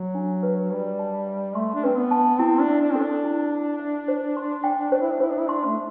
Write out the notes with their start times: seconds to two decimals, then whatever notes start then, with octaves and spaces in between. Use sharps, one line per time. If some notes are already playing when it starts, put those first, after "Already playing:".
Already playing: F#3
0.15 D4
0.43 B4
0.71 G3 B4
0.99 A5
1.27 E5
1.55 A3 C6
1.75 D4
1.84 C4 B4
1.97 B3
2.11 A5
2.39 C4 E4
2.61 D4
2.68 E5
2.81 D4
2.93 C4 A4
3.03 D4
3.24 E4
3.51 E4
3.79 E5
4.08 C5
4.37 C6
4.64 G5
4.92 D4 C5
5.01 E4
5.11 D4
5.20 E4 C5
5.30 D4
5.39 E4
5.48 D4 C6
5.66 A3